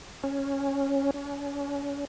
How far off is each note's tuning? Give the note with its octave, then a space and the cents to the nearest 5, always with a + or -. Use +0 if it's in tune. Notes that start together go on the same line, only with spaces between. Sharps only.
C#4 -5
C#4 +35